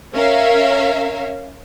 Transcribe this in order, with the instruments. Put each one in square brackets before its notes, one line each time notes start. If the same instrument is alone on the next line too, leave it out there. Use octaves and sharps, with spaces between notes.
[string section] C#4 A#4 E5 F5